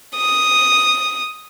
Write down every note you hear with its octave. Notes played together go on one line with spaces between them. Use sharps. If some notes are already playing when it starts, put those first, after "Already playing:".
D#6